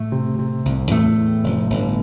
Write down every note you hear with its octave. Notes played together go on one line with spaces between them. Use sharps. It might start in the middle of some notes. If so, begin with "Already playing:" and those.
Already playing: A2 A3
C3
C3
C2
E2 A2 A3
E2
F1
G1